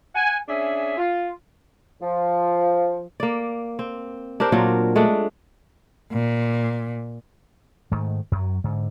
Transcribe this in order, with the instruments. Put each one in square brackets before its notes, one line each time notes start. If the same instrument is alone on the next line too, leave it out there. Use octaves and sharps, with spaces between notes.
[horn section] F#5 G#5
C#4 D4 G#4 E5
F4
[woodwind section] F3
[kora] A#3 D5
C4
D4 G4 A#4 C5
A#2 F#3 F4 A#4
G#3 A3 D4
[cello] A#2
[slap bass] G#2 D#3 A3
F#2 F#3
G#2 D3